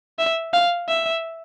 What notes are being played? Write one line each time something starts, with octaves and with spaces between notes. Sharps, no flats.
E5
F5
E5